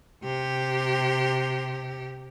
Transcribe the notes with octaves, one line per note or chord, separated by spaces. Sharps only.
C3 G4